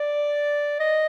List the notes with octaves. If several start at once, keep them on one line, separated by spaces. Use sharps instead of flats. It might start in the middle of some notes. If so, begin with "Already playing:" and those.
Already playing: D5
D#5